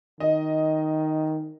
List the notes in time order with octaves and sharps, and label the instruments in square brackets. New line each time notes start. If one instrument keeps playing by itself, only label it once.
[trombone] D#3 [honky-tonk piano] D#5